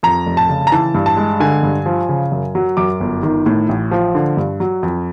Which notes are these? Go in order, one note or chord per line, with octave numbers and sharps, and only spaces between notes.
F2 A#5
F1
A5
C#3
A#5
E3 A5
G2
A5
G#3
D3 G#5
G2
F3
C#3
F#2
F#3
F#2 D6
G1
D#3
A2
A1
F3
D3
G2
F#3
F2